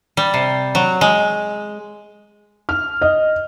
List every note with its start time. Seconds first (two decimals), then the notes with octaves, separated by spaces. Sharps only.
0.17 G3
0.34 C3
0.75 F#3
1.01 G#3
2.69 F6
3.01 D#5